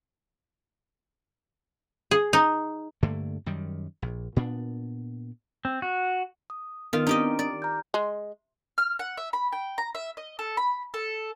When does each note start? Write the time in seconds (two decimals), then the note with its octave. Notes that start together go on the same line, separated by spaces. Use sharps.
2.11 G#4
2.33 D#4
3.03 G2 D3 A3 A#3
3.46 F#2 D#3 G3
4.02 A#1
4.36 A#2 B3 D4
5.65 C4
5.82 F#4
6.50 D#6
6.93 D#3 B3 F4
7.07 C4 D4 D#4 G4 D#5 D7
7.39 D5
7.62 A#5 F6 G6
7.94 G#3
8.78 F6
8.99 F#5
9.17 E5
9.33 B5
9.52 G5
9.78 A#5
9.95 E5
10.17 D#5
10.39 A4
10.57 B5
10.94 A4